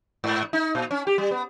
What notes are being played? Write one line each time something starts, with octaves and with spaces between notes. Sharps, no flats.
G#2
D#4
A#2
C#4
G4
G3
B3